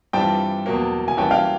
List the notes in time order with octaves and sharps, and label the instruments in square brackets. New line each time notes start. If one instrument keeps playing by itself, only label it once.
[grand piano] G2 E3 G3 C4 F4 [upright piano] G5 A5
[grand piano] E2 B2 F#3 A#3
[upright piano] G#5
[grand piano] E3 G3 A#3 C#4 F#4 [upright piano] G5 A5
[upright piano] F5 G5